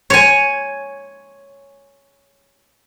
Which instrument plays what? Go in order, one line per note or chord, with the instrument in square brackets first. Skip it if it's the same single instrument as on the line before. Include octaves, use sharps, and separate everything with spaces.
[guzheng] C#5 G#5